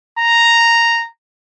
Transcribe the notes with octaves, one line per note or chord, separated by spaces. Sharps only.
A#5